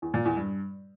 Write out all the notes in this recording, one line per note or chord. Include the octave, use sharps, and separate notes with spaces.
E2
A#2
E2
G2